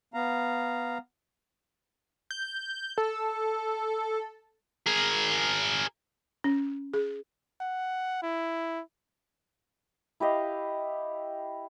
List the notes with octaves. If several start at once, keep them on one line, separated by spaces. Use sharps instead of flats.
B3 F5 A#5
G6
A4
G#4 A#4
C#4
G#4
F#5
E4
E4 G4 D#5 F5